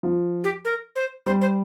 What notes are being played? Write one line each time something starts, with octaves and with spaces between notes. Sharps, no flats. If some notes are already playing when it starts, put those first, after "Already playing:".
F3
G4
A#4
C5
G3 C5
C5